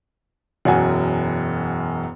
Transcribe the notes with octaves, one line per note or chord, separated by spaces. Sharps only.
E1 F#2 F#4 G#5